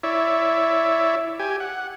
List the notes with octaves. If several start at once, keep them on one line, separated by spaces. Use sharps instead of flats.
E4 C#5 D5 E5
G4 G#5
F#5